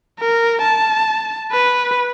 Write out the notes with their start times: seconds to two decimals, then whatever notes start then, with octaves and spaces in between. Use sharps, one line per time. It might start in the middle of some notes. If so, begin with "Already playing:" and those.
0.20 A#4
0.62 A5
1.52 B4